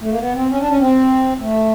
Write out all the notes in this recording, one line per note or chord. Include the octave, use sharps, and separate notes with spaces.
A3
A#3
B3
C4
C#4
D4
C#4
C4
A3